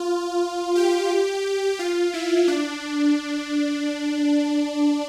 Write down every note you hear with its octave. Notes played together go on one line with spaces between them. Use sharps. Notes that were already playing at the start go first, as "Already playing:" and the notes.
Already playing: F4
G4
F4
E4
D4